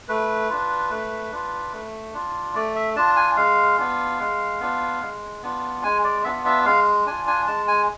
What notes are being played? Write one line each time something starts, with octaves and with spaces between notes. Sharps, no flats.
A3 B4
D4 F4
A3
D4 F4
A3
D4 F4
A3 D5
E5
D4 F4 A5
G#5
G#3 F5
B3 D4 F4
G#3
B3 D4 F4
G#3
B3 D4 F4
G#3 G#5
D5
B3 D4 F4 E5
E5
G#3 F5
D4 F4 G#5
G#5
G#3 A5
G#5